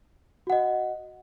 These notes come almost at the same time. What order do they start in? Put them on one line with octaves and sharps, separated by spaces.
F#4 F#5 D#5